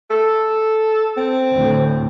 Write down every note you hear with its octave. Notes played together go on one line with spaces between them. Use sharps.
A4
C4
D2 A2